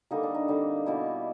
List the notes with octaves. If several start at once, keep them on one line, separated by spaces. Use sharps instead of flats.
D3 G3 A#3 D#4
D4
D#4
D3 G3 C4
B2 G3 A#3 E4